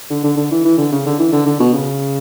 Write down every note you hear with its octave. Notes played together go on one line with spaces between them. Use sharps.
D3
D3
D3
E3
E3
D3
C#3
D3
E3
D3
D3
B2
C#3